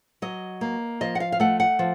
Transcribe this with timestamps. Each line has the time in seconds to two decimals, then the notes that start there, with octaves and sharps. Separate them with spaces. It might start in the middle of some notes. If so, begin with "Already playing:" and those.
0.22 F#3 D#5
0.61 A#3
1.01 F3 D#5
1.15 F#5
1.20 F5
1.32 F5
1.40 A3 F#5
1.60 F#5
1.79 F3